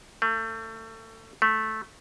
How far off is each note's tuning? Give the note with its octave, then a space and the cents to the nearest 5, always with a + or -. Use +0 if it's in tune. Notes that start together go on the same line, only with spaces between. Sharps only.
A3 +30
A3 -10